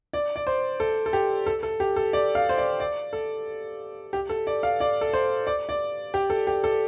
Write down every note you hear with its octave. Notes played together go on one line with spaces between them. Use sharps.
D5
D5
C5
A4
A4
G4
A4
A4
G4
A4
D5
F5
C5
D5
D5
A4
G4
A4
D5
F5
D5
A4
C5
D5
D5
G4
A4
G4
A4